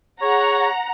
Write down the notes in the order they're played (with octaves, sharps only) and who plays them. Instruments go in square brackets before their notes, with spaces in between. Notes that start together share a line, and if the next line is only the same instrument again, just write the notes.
[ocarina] G#4 [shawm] C#5 [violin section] F#5 A#5